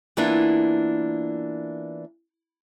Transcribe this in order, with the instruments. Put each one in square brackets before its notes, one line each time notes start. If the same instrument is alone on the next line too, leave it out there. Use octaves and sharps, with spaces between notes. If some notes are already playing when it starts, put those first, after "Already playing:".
[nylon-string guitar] E3 A#3 B3 D4 E4 F4